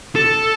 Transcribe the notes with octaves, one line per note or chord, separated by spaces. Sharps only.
A4